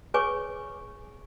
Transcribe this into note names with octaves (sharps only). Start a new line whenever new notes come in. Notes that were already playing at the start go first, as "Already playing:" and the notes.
G#4 B4 C#5 G#5 C#6 D6